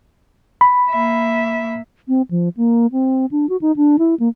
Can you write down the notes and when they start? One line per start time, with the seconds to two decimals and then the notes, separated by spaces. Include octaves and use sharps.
0.61 B5
0.91 A#3 E5
2.08 C4
2.31 F3
2.57 A#3
2.92 C4
3.31 D4
3.49 F#4
3.61 D#4
3.76 D4
3.99 E4
4.20 A#3